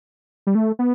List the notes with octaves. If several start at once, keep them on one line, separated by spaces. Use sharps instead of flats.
G3
A3
B3